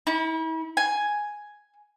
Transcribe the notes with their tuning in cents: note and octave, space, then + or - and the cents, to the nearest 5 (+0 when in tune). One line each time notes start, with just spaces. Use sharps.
E4 -40
G#5 +5